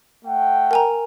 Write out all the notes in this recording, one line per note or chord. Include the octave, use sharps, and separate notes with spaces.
A3 F#5 G5
A#4 G#5 A#5